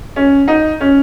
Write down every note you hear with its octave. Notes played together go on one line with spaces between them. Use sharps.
C#4
D#4
C#4